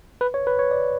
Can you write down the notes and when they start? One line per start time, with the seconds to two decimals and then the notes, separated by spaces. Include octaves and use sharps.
0.21 B4
0.34 C#5
0.47 B4
0.59 C#5
0.71 D5